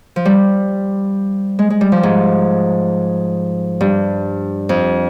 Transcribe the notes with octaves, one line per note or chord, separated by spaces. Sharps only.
F3
G3
G#3
G#3
G3
F3
G#2
G2
F2